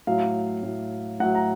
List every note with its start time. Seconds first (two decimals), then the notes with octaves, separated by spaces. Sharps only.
0.07 A2 F#3 F5
0.63 A2 F#3
1.20 A2 F#3 F#5
1.35 A#5